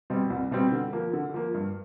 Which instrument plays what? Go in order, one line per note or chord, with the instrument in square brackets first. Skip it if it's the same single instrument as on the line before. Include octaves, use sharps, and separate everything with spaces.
[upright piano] B2 G3 C4
C2
B2 G3 C4
D3
F3 A#3
D3
F3 A#3
G2